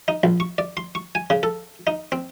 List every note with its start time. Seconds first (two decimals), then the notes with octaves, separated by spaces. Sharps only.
0.08 D#4
0.23 A#1
0.40 C#6
0.58 D5
0.77 C6
0.95 C#6
1.15 G#5
1.30 C#3
1.43 A4
1.87 D#4
2.12 C4